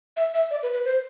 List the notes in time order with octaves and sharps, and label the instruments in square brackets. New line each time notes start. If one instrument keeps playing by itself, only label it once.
[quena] E5
E5
D5
B4
B4
C5